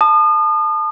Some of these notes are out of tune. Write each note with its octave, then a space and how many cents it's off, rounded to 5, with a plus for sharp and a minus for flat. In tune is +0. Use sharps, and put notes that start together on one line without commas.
A5 +0 D#6 -40